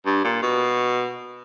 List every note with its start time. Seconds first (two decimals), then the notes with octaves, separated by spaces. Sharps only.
0.06 G2
0.24 A#2
0.42 B2